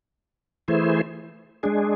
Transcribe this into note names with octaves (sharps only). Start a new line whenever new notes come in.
E3 A3 E4 G#4 C5
G#3 D4 G#4